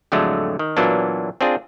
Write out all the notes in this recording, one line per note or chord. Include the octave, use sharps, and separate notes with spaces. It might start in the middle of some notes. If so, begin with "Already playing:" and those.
F2 A2 D3 F#3 G#3 A3
D#3
A#2 E3 F#3 A#3 B3 D4
C4 D4 F4 G#4